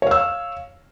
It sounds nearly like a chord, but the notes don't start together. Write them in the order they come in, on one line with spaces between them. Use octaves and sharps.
C#5 F5 E6